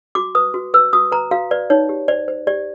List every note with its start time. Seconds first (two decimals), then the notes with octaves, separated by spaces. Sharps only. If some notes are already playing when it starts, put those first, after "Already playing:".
0.15 F#4 D6
0.35 B4 D#6
0.54 F#4
0.74 B4 E6
0.93 F#4 D#6
1.12 B4 A#5
1.31 F#4 F5
1.51 B4 D5
1.70 D#4 C#5
1.89 G4
2.08 C5 D5
2.28 C5
2.47 G4 D5